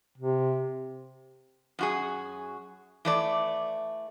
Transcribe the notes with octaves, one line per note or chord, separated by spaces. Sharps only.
C3
F#2 F#4 G#4
E3 A3 D5